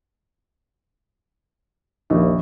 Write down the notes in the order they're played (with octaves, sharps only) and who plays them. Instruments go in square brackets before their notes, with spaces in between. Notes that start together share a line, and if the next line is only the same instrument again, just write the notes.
[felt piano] A#1 [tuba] D#2